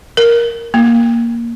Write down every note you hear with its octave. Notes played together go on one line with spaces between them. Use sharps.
A#4
A#3